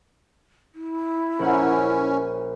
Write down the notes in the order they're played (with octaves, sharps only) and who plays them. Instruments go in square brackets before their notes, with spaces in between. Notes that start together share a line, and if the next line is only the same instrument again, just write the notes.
[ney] E4
[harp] A#1 F#5 [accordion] C#4